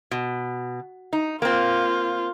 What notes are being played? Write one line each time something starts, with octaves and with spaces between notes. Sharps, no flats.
B2
D#4
A#3 C4 F4